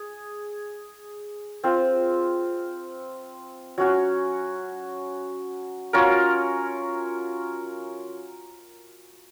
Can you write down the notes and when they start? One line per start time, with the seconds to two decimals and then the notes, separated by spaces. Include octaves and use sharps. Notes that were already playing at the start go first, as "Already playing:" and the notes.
Already playing: G#4
1.63 C4 F4 C5
3.78 F#3 C#4 F#4
5.93 F#3 C#4 F4 A#4